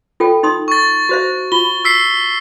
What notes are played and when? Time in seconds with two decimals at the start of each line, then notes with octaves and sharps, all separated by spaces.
0.20 F4 A4 G5
0.43 D#4 C6 D#6
0.68 C#6 A6
1.09 F#4 C5 E5
1.52 F4 G7
1.85 E6 B6 C7